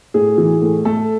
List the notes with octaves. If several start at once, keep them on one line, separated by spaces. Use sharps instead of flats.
A2 G#4
E3
A2
A3 A4